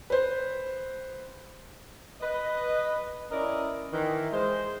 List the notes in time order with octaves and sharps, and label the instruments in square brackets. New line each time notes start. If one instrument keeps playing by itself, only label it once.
[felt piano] B4 C5
[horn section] B4 D#5
C#4 E4 A#4 D5 D#5
D#3 E3
G#3 C5